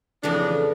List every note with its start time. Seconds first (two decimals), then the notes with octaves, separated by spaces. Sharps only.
0.23 F2 C#3 E3 A3 D4